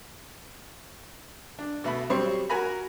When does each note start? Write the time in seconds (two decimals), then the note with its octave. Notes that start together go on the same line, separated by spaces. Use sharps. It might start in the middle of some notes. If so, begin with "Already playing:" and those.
1.59 D4
1.84 B2 A3 B5
2.10 F#3 G3 C4 C5 C#5 C#6
2.49 F#4 A#4 G#5 A#5 B5